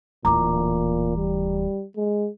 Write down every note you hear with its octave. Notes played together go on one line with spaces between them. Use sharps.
D1 A#2 E3 A#5 D6
G3
G#3